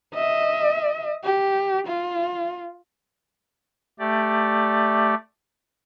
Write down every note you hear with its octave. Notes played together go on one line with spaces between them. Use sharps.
D#5 E5
G4
F4
A3 G4 D5